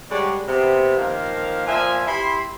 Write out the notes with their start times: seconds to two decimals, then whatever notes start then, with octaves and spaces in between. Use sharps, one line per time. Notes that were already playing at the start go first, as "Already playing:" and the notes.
0.11 D3 G3 G#3 F#4 C#5 D5
0.48 C3 B3
0.98 D#3 F3 A#3 A#4 F5
1.67 A#2 F3 E5 G#5
2.08 E4 G4 B5 C6